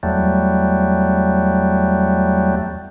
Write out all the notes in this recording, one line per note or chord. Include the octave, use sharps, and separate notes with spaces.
E2 F#3 G3 A3